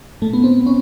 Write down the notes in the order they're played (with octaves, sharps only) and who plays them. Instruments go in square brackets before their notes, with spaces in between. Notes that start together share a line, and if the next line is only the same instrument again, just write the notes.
[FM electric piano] A#2 A3
B3
C4
C#4